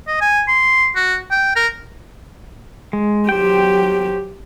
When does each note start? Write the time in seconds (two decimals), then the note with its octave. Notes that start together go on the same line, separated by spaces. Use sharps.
0.07 D#5
0.21 G#5
0.47 C6
0.95 F#4
1.31 G5
1.55 A#4
2.93 G#3
3.29 F#3 G4 C5 G5